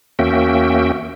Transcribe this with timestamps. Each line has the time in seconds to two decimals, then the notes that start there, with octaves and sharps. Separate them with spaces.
0.19 E2 A#3 C#4 F#4 E5 G5